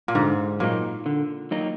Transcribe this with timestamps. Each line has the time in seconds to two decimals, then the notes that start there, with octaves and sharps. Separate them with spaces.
0.08 A#2
0.15 G#2 D3
0.60 A#2 F#3 A#3 D#4
1.06 D3
1.51 F#3 A#3 D#4